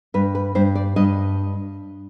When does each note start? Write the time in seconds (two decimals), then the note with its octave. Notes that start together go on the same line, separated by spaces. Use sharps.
0.14 G2 B4
0.35 B4
0.55 G2 C5
0.75 D5
0.96 G2 D#5